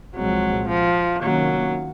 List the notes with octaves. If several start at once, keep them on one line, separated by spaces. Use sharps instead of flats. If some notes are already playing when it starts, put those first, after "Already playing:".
C2 A#2 F3 F#3 G#3 C4
F3
C3 D#3 F#3 A#3 C#4